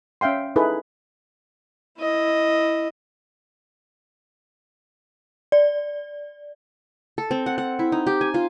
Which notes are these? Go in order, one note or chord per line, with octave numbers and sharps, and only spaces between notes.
C#4 E5 F5 G5 C6
D#4 E4 G#4 A4 B4
E4 D#5
D5
A4
C4
F#5
F#5
E4
D#4
G4
G#5
F4